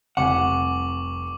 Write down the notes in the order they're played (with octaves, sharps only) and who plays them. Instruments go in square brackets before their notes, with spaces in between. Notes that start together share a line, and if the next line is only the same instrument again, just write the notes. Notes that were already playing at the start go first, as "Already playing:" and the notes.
[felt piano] F1 C2 G#5 [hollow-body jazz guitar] F#5 [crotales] C#6 D6 F#7